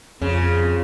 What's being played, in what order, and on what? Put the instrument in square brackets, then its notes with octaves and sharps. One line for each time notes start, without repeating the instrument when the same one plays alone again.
[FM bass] F2 [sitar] C#3 [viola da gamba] C4 F4 G#4